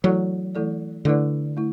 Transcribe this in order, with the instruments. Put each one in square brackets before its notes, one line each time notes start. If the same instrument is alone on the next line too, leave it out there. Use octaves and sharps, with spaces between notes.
[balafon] E3 A3 E4 A4 D5 [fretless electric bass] F#3
[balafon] E3 A3 E4 A4 D5
[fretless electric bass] D3 [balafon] A3 E4 B4 D5
[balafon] A3 E4